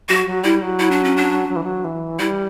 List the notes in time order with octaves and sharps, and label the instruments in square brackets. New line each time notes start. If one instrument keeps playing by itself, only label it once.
[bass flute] F#3 [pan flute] F#4
[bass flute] F#3
[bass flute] G3 [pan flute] E4
[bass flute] F#3
[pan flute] E4
D4
C#4
D4
[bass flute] F#3
E3
F#3
E3
[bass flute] G3 [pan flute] E4